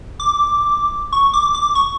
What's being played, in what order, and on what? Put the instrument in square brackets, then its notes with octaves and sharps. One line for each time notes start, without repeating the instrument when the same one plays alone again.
[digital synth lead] D6
C#6
D6
D6
C#6